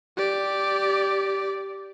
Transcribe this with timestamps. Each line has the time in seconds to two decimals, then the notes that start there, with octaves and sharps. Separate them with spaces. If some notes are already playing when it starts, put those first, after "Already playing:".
0.17 G4 D5